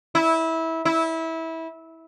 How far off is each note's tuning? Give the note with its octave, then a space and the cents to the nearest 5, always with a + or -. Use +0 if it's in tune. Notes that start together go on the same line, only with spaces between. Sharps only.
E4 -20
E4 -20